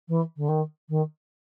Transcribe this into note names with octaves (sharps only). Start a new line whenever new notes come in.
E3
D3
D#3
D#3